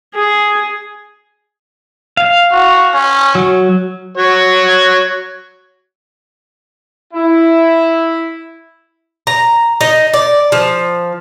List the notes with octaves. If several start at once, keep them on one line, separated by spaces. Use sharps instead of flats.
G#4
F5
F#4
C#4
F#3
F#4 C#5
E4
A#5
D#4
D5
F3